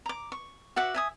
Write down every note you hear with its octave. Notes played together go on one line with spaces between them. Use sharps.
A#5 D6
C#6
F#4 E5 F#5 D6
E5 G#5 D#6